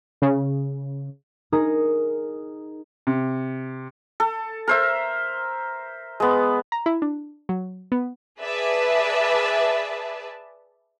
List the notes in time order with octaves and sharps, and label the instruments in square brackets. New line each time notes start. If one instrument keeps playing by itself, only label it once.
[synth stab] C#3
[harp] D#4 G#4 A#4
[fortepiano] C3
[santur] A4
A#4 C5 E5
G#3 B3
[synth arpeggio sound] A#5
E4
D4
F#3
B3
[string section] G#4 B4 D5 E5 A5